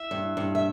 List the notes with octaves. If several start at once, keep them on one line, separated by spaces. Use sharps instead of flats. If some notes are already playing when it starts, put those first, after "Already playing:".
Already playing: E5
G2
G2
E5